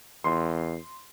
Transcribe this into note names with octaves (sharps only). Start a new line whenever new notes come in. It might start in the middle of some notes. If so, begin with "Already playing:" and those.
E2 C6